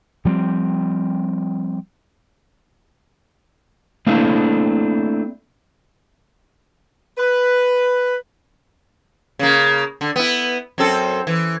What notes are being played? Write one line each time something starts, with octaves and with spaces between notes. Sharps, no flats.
F3 G3 B3 C4
A3 A#3 C4 D4 E4 F5
B4
C#3 A#3
D3
B3 E4
F#2 C4 A4
E3